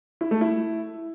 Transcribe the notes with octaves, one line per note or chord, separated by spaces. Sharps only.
E4
A3
E4